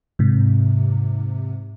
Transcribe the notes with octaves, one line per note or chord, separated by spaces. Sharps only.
G#2 C3